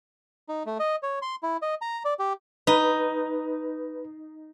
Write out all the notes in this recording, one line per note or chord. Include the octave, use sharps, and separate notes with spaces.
D#4
A3
D#5
C#5
C6
E4
D#5
A#5
D5
G4
D#4 B4